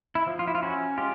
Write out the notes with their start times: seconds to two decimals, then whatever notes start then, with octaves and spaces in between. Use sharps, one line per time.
0.15 E4
0.27 F3
0.39 F4
0.48 E4
0.55 F4
0.62 C#4 E4 F#4
0.97 G#3 F4 G4